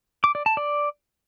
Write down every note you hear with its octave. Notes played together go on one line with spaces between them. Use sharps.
D6
D5
A5
D5